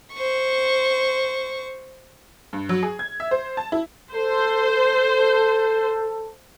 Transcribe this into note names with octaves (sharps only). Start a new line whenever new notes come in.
C5 C#6
G2
F#3
G#4
G#6
E5
C5
A5
E4
A4 C5